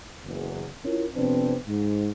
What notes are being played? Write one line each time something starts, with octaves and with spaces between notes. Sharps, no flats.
F#1 E2
C#4 E4 F4 A#4
F2 C3 B3 C4 D4 B4
G#2